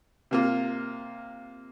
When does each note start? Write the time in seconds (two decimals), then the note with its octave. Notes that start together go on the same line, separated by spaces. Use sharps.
0.31 C3 A#3 F4